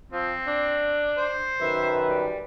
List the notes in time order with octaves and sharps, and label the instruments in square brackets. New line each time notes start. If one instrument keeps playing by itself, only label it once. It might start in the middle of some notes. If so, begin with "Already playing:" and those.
[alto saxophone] F3 [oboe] C4
[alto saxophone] D4
[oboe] C5
[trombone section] F#2 D#3 B4 [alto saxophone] E5
[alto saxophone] G3